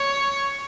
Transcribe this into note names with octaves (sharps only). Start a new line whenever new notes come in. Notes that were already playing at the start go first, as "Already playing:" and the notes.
Already playing: C#5